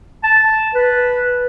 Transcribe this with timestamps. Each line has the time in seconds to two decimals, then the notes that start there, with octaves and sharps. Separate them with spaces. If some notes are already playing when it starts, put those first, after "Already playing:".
0.24 A5
0.75 B4